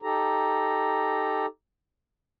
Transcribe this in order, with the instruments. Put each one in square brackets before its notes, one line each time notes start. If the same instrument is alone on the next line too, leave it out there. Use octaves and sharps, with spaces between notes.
[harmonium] D#4 G4 A4 A#5